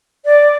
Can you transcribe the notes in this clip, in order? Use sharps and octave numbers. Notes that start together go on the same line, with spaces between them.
D5